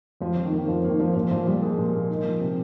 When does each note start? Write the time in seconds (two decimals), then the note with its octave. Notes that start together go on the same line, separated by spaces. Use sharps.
0.21 F2 F3
0.36 F2
0.45 D#3
0.52 A#3
0.58 D#3
0.68 F2 F3
0.84 A#3
0.90 D#3
1.00 F3 A#3
1.15 A#2 F3
1.30 A#2 F3
1.46 F3 G3
1.62 G#3 A#3
1.78 A#2
1.93 A#3
2.10 D#4
2.24 F3
2.41 C3